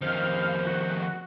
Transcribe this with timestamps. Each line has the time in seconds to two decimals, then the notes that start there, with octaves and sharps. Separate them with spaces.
0.02 F2 D#3 C5 F5
0.67 F#4